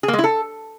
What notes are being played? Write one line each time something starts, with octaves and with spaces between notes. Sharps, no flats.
G#4
A#3
G#3
E4
A4